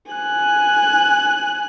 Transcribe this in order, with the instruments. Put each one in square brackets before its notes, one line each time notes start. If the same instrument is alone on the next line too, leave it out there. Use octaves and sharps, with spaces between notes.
[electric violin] G#5 F#6